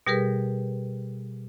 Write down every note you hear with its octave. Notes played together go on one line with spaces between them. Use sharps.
B2 G3 G4 G#4 A#4 B4